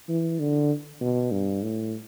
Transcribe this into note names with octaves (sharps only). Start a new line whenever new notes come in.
E3
D3
B2
G2
A2